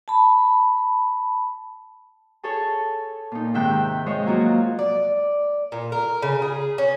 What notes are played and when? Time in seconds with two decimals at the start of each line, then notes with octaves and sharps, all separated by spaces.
0.08 A5 B5
2.43 G#4 A4 C#5 G#5 A5
3.32 A#2 D#4
3.54 G#2 C3 D#3 E5 G5 F#6
4.06 F3 G#3 C5 C#5 D#5
4.26 F#3 A#3 F4 F#4
4.79 D5
5.72 A#2
5.92 A#4
6.22 C#3
6.42 G#4
6.78 C#4